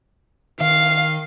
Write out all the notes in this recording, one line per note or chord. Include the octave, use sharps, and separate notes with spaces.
D#3 F5